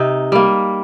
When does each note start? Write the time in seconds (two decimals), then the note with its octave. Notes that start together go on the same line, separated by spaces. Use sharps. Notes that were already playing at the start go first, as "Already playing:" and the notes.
Already playing: C3 D#4
0.32 G3 A#3